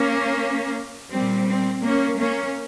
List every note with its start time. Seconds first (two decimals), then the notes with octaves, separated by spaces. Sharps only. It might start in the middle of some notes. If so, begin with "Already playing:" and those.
Already playing: A#3 C#4
1.10 A#2 G3 C4
1.47 C4
1.84 A#3 C#4
2.19 A#3 C#4